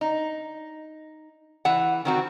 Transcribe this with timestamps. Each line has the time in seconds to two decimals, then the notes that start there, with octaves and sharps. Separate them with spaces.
0.01 D#4
1.65 E3 F#5
2.05 D#3 C4 F#4